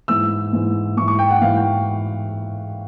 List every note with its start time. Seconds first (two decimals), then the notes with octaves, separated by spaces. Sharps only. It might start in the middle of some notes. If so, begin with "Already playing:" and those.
0.08 G#2 E3 E6
0.53 G#2 E3
0.97 G#2 C#6
1.01 E3
1.08 C#6
1.19 G5
1.30 F#5
1.41 G#2 E3 F5
1.57 G5